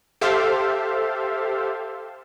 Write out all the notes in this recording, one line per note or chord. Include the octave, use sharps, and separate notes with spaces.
G4 A4 C5 E5 F5